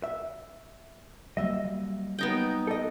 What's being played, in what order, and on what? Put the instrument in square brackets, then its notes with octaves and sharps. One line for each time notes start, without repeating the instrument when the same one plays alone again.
[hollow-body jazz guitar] E5
[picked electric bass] F#3 G3 A#3 [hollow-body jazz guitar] D#5 E5
[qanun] B3 D#4 G5
[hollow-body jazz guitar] A4 D#5